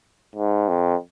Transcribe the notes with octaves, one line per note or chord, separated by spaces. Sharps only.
G#2
F2